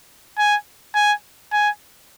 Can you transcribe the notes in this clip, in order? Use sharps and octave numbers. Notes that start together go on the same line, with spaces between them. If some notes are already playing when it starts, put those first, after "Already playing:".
G#5
G#5
G#5